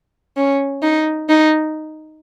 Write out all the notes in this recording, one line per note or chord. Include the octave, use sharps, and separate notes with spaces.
C#4
D#4
D#4